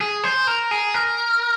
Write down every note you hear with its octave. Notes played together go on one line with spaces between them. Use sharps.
G#4
C5
A#4
G#4
A#4